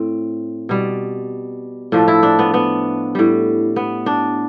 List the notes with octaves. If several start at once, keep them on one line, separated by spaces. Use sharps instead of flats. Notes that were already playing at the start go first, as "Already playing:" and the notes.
Already playing: A2 C4
B2 G3
A2 F3 A3 D4
E4
D4
B3
B3
A2 G3
B3
D4